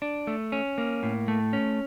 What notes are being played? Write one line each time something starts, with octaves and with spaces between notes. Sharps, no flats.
D4
A3
C#4
A#3
A2
A3
C#4